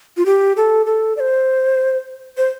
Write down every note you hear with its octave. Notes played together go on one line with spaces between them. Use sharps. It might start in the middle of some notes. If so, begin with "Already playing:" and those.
F4
G4
A4
A4
D5
C5
C5